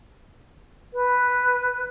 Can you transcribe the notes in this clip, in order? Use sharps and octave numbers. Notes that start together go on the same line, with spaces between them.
B4